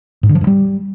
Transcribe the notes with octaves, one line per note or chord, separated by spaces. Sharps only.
G#2
D3
F3
G2
G3